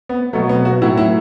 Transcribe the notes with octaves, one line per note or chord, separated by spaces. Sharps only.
B3
B2 F#3 A3
B3
F#4
A2 F#3 E4
E4